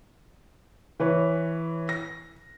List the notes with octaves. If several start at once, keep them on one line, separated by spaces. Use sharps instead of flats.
E3 B4 C#5
A#6